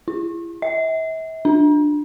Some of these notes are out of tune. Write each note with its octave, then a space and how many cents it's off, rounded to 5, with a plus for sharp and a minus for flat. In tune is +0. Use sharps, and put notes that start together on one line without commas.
E4 +40
E5 -40
D4 +15